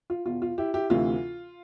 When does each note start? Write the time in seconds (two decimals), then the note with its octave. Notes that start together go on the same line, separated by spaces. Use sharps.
0.10 F4
0.26 E2 B2 F4
0.42 F4
0.58 E4 G4
0.74 E4 G4
0.90 D2 C3 E3 F4